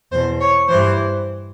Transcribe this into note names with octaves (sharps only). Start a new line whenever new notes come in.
E2 B2 C5
C#5
G2 E3 C5